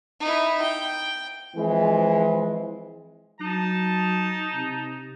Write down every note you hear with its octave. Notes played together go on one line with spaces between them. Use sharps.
D#4 E4
G5
E3 F3 G#3 C4 E4 C5
F#3 D#4 A5
C3